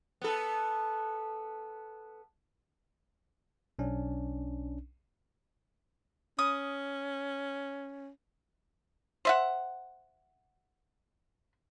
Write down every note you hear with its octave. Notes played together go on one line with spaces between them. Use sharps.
B3 A4
B1 C#4 D4
C#4 D#6
C5 E5 F#5